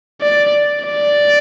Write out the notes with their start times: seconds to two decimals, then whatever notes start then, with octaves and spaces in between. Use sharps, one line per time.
0.21 D5
0.85 D5